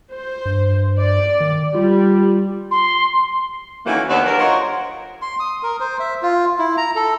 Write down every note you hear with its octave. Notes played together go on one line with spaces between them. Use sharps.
C5
G2
D5
D#3
G3 F4
C6
D#3 E3 F#3 A3 A#3 C#4
D#2 B3 D4
D3 F#3 G4 A#4
F4 A#4 C5 C#5 D#5 F#5
C6
D#6
A#4
C5
E5
F4
E4
A#5
A4